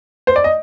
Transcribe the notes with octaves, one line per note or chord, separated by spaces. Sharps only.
C5
D5
D#5